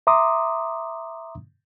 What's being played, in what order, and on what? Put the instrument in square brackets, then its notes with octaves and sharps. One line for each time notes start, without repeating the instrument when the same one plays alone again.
[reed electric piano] E5 A#5 C6 D6 D#6